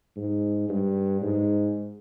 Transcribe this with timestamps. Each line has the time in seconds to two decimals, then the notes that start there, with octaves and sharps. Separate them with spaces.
0.17 G#2
0.69 G2
1.22 G#2